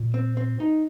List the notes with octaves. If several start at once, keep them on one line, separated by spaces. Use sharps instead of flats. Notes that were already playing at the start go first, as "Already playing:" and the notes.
Already playing: A#2
C4
C4
D#4